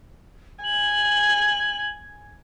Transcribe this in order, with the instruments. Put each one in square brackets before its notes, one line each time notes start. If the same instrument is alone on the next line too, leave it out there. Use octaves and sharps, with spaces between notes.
[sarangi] G#5 [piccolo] F#7